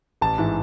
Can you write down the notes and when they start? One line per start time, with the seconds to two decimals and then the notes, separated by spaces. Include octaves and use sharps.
0.21 A1 A5
0.38 G#2 E3